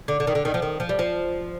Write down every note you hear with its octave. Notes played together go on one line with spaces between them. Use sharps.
D3
D3
D#3
D3
D#3
F3
D#3
F3
G3
F3